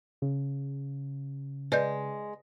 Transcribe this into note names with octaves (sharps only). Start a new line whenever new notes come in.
C#3
G#3 B4 D5 G6